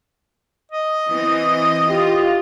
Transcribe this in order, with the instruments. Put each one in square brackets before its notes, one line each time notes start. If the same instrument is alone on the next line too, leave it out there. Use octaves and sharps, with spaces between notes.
[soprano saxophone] D#5
[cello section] E3 C4
[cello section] F4 [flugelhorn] G4